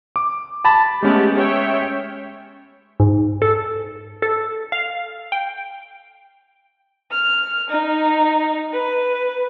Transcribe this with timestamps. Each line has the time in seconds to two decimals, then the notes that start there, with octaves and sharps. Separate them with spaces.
0.16 D6
0.65 A5 B5
1.03 G#3 A3 B3 C#4 G4
1.36 C#5 E5 G5
3.00 G#2
3.42 A4
4.22 A4
4.72 F5
5.32 G5
7.11 F6
7.68 D#4
8.72 B4